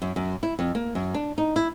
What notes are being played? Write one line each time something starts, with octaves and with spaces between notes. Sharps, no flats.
F#2
F#2
E4
F2
A#3
F#2
D4
D#4
E4